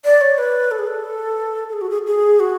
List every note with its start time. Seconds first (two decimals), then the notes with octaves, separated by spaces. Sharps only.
0.05 D5
0.21 C#5
0.38 B4
0.71 A4
0.79 G#4
0.86 A4
1.69 A4
1.73 G#4
1.81 F#4
1.90 G#4
2.07 G#4
2.40 F#4